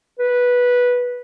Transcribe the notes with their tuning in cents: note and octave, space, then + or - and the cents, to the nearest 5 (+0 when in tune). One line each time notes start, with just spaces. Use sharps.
B4 -10